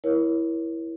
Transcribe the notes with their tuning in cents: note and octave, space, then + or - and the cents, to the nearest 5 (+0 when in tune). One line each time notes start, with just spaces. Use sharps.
E4 +0 A#4 +35 C#5 +0